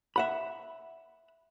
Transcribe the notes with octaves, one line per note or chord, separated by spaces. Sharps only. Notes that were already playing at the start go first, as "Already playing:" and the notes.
E5 F#5 B5